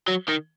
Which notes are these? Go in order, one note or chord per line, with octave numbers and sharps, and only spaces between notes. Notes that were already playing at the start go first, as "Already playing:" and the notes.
F#3
D#3